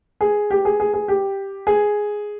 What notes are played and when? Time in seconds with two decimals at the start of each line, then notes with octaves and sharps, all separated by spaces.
0.21 G#4
0.50 G4
0.65 G#4
0.80 G#4
0.94 G#4
1.08 G4
1.67 G#4